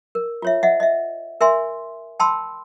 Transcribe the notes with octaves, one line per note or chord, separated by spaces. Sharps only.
A#4
F4 C#5 E5
D#5 E5 F#5
D#5 E5
A#4 E5 G#5 C6
G5 A5 B5 C6 E6